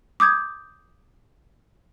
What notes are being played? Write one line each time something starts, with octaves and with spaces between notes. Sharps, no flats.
D6 D#6 G6 G#6